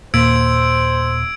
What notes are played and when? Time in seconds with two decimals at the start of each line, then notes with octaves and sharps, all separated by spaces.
0.14 D#2 A#2 C5 E6 G#6 D7